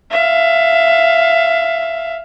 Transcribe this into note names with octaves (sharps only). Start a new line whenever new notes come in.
E5 F5